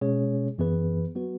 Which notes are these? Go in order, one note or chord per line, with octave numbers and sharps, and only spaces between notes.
B2 G#3 C#4 G#4 C#5
F#2 E3 B3 G#4 B4
F#3 B3 F#4 B4